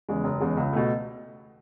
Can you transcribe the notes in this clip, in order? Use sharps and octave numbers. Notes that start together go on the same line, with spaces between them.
E2 C#3 G#3
F#1
E2 C#3 G#3
C#2
B2 A3